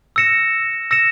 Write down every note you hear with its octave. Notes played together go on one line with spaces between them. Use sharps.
E6 A#6 C#7 E7
E6 A#6 C#7 E7